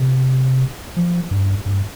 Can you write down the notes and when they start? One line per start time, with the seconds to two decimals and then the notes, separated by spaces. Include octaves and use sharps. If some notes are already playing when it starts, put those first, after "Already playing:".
Already playing: C3
0.96 F3
1.31 G2
1.66 G2